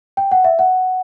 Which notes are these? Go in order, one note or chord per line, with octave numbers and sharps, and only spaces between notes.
G5
F#5
E5
F#5